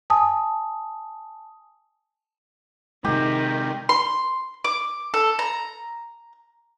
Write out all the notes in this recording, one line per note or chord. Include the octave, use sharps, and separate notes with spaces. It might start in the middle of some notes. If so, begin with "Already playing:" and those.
G#5 A5 D#6
C3 D#3 G#3 G4
C6
D6
A4
A#5